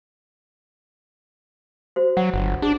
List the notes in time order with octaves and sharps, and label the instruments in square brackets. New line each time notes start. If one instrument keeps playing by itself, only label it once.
[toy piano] F#4 C5
[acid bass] F#3 [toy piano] F#5
[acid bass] G1
[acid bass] D4 [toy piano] G#4